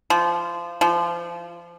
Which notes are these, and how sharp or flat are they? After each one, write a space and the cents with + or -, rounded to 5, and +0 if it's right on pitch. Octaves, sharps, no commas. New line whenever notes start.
F3 -20
F3 -25